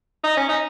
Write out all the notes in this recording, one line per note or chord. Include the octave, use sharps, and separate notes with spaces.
D#4
C#4
D#4